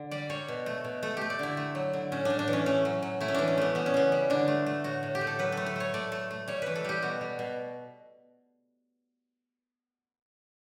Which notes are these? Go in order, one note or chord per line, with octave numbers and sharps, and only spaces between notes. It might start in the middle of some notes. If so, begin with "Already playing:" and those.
Already playing: D3
G3 D5
G3 C#5
B2
A3
B2
A3 A4
A3 G4
D5
D3 E4
A3
F#3
D3
A2 C#4
A2 D4
D4
E3
C#4
A3 C#4
F#3
F#3
A3 E4
C#4
E3 D4
C#4
A3 B3
G3 B3
C#4
C#3 B3
G3
D3 D4
A3
A3
A2 F#4
A2
G4
A3
A4
F#3 B4
A3 A4
A4
A3 C#5
A3 D5
A3
A3
G3 C#5
E3 B4
A4
G3 G4
B2 F#4
G3
B2